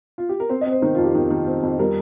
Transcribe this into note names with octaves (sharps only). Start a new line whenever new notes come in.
F4
G4
A#4
C4 C5
D#5
C4
C5
D#3 D#4
F2 F4
G4
D#3
D#3
C4
F2
G3 A#4